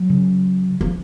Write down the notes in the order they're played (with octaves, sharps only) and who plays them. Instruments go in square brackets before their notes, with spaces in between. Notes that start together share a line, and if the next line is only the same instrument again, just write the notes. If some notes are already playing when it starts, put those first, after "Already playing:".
Already playing: [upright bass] F#3
[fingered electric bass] C#3
[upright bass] F3